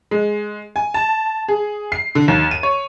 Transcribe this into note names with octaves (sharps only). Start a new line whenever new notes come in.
G#3
G#5
A5
G#4
C7
D3
D#2
D#7
C#5